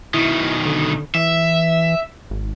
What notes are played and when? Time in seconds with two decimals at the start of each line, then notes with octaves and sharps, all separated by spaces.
0.14 B2 D#3 E4
0.66 D3
1.15 E3 E5
2.30 G#1